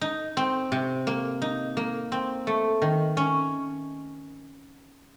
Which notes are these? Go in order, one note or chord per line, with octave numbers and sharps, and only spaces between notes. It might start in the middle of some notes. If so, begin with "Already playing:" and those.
D#4
C4
C3
A#3
D#4
A#3
C4
A3
D#3
C#4